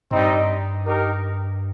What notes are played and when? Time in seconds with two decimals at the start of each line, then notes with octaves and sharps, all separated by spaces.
0.11 G2 G3 C4 D#4
0.83 D#4 G4 A#4